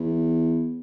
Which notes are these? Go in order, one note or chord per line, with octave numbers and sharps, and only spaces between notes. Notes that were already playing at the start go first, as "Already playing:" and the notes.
Already playing: E2